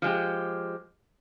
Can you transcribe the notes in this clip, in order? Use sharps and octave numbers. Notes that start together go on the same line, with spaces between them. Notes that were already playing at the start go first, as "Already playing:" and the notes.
F3 G#3 G4